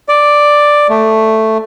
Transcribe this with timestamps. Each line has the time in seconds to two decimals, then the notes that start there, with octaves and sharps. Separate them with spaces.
0.09 D5
0.89 A3